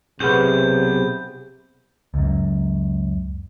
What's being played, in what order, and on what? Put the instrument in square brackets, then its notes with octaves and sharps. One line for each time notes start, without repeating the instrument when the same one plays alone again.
[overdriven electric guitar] B1 [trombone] C3 [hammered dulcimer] B3 G#4 [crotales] G6
[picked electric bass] C#2 F#2